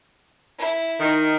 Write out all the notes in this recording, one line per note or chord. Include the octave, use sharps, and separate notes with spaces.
E4
D#3